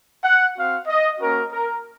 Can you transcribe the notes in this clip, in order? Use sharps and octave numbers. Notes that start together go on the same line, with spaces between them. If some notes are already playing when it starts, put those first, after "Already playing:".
F#5
C4 F#4 F5
D#5
A#3 C#4 F#4 A#4
A#4